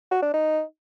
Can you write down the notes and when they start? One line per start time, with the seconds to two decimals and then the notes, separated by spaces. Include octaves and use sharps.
0.11 F#4
0.22 D4
0.34 D#4